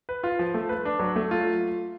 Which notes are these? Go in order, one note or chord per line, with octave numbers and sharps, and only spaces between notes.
B4
F4
F3
A3
B4
D4
F#3
A3
F4